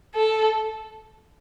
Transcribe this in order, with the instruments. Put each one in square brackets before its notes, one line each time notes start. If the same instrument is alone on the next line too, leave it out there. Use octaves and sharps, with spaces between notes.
[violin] A4